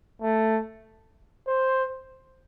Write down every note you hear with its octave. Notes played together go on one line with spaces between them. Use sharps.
A3
C5